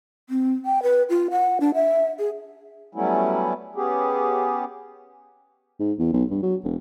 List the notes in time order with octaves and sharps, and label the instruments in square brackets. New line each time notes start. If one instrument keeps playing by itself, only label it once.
[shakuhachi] C4
G5
B4
F4
F#5
D4
E5
G#4
[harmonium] F#3 G3 A3 B3 C#4 E4
B3 C#4 G4 G#4
[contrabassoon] G#2
E2
B1
G2
F#3
E1